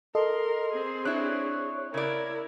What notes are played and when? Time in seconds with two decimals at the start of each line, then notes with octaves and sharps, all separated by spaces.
0.15 A4 A#4 D#5 C6
0.73 C4 G#4
1.05 D4 E4 C#5 F#6
1.94 C#3 E4 A#4 D5 G#6